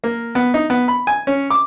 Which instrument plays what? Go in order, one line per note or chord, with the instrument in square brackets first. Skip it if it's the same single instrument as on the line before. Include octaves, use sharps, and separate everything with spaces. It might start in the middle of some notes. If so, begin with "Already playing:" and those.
[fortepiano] A#3
B3
D#4
B3
B5
G#5
C#4
D6